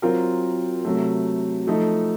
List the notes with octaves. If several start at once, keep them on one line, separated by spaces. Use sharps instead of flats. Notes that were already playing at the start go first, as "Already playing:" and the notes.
F#3 C4 F4 A#4
C3 F#3 A3
F3 A3 D#4 A4